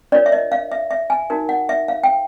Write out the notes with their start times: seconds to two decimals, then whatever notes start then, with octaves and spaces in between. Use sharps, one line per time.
0.12 D4 F4 A#4 C#5 D5
0.26 E5
0.32 D#5
0.52 F5
0.72 E5
0.91 E5
1.10 G#5
1.30 D#4 F#4 A#4
1.49 F#5
1.69 E5
1.88 F5
2.04 G5